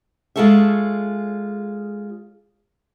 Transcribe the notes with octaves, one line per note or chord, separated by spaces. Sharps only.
G#3 F4 G#4 A4 C#5 E5